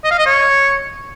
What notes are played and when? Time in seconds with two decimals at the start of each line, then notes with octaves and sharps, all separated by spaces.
0.04 D#5
0.11 F5
0.18 D#5
0.26 C#5